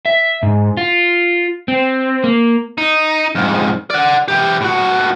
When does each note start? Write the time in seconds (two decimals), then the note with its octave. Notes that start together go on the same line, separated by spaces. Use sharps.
0.06 E5
0.43 G#2
0.77 F4
1.68 C4
2.24 A#3
2.78 D#4
3.35 F2 G#2
3.90 D5 F#5
4.28 E3 G4
4.61 A2 F#4